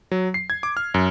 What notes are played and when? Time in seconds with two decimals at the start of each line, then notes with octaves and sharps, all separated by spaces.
0.11 F#3
0.34 C7
0.50 G#6
0.63 D6
0.77 F6
0.94 F#2